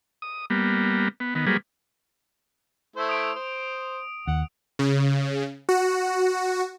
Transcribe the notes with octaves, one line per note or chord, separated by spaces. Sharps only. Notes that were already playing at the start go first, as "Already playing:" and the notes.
D#6
G3 A#3 B3
B3
D#3 B3
F#3 G3 A#3 G#4 B4
A3 E4 C5
D#6 D7
C5
D#2 F#5
C#3
F#4